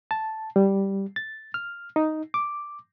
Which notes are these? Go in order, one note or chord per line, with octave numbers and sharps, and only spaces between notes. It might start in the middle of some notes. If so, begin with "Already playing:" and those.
A5
G3
A6
F6
D#4
D6